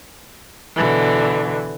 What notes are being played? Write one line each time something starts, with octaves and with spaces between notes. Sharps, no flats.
B2 D3 E3